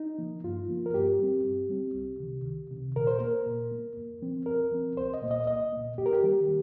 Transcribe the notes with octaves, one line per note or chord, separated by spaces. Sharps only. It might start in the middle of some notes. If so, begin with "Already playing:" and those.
Already playing: D#4
F3 A#3
G2 F4
F3 A#3
A#4
G2 G4
G3 C4
G2
G3 C4
C2
C3 D#3
C2
C3 D#3
A#2 A#4
C5
A#3 A#4
A#2
A#3
F2
F3 C4
F2 A#4
F3 C4
C2 C5
D#5
A#2 A#3
D#5
C2 D#5
A#3
A#2
F2 G4
A#4
G4
D#3 G3 A#3